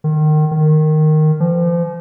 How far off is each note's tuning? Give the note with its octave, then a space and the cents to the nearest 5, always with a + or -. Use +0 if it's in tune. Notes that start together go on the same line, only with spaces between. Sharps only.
D#3 -25
D#3 -10
F3 -35